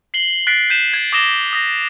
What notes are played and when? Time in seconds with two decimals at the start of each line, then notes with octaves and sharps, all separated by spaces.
0.14 C7 F#7 G7
0.47 F#6 A6 B6 C7 D7
0.70 G6 B6 D#7 E7
0.93 G#6
1.13 D6 D#6 A6 A#6 E7 G7
1.53 D#6 A#6